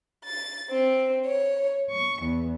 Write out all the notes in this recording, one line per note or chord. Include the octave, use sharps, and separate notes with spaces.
A6
C4
C#5
C#6
E2